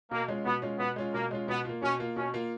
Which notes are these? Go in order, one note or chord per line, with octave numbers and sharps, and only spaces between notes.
B2 A#3
G#3 C#4 F4
B2 B3
G#3 C#4 F4
B2 B3
G#3 C#4 F4
B2 A#3
G#3 C#4 F4
B2 B3
A#3 F4
B2 C#4
A#3 F4
B2 C#4
A#3 F4